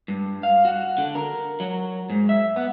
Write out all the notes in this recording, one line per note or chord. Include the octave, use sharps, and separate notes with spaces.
G2
F5
F#4
D3
A#4
F#3
G#2
E5
B3